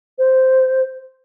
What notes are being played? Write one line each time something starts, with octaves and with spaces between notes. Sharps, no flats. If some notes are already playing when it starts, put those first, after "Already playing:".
C5